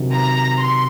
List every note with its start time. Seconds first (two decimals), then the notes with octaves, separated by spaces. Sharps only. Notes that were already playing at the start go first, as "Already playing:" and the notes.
Already playing: C3 D#3 F#3
0.13 A#5
0.59 C6